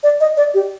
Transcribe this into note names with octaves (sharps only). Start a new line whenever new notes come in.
D5
D#5
D5
G4